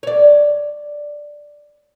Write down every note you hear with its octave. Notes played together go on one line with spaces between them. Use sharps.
C#5 D5